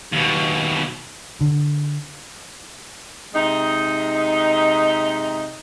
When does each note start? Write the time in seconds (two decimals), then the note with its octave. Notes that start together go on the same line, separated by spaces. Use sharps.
0.13 D#2 B2
1.41 D3
3.34 C3 G#3 D#4